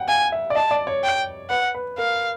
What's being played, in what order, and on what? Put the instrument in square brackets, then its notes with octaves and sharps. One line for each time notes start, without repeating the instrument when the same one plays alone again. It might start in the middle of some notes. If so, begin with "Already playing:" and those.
Already playing: [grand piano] F#5 G5
[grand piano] F5 [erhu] G#5
[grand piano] E5
D5
[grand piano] D#5 [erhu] A5
[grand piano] D5
C#5
[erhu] G5
[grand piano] B4 [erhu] F#5
[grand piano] B4
[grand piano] A#4 [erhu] F5